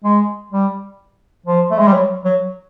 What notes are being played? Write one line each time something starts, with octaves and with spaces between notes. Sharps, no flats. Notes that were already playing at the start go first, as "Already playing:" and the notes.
G#3
G3
F3
A3
G#3
G3
F#3
F#3